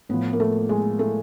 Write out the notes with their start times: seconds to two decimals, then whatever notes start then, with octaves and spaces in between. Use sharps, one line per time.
0.09 A2 F3 B3
0.33 A#3
0.40 A3
0.69 G#3
0.99 A3